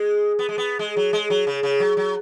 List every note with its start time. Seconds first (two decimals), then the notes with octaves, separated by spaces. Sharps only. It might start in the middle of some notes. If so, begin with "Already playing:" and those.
Already playing: G#3
0.39 B3
0.49 G#3
0.58 B3
0.79 G#3
0.97 F#3
1.13 G#3
1.30 F#3
1.47 C#3
1.63 C#3
1.80 F#3
1.97 F#3